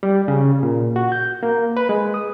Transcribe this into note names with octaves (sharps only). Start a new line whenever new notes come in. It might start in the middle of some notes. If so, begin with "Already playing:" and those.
G3
C#3
A#2
F#4
G6
A#3
B4
G#3
D#6